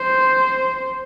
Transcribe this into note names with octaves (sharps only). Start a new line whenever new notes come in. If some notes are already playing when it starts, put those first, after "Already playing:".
Already playing: C5